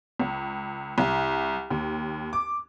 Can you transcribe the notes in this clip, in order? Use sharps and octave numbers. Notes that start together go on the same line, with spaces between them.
C#2
C2
D#2
D6